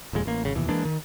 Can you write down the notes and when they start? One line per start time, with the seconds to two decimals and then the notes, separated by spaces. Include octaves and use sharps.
0.13 D#1 F2 A#2 G#3
0.26 A1 A#3
0.44 G#1 C#3
0.55 F1 D#2 B2 E3
0.69 E3 G#3 A#3 D4
0.85 D#3